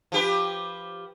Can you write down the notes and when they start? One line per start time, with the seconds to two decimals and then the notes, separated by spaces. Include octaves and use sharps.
0.12 F3 G4 B4